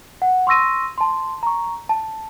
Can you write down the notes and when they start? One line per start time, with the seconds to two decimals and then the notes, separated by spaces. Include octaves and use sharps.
0.22 F#5
0.47 C6 C#6 E6 A#6 D#7
0.98 A5 C6
1.43 A#5 C#6
1.89 A5